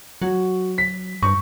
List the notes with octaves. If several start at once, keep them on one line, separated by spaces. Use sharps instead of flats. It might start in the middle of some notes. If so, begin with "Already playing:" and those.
F#3 F#4
B6
G2 C#6